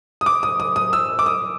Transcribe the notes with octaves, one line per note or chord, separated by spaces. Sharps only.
D#6
D6
D#6
D#6
D#6
E6
D6
D#6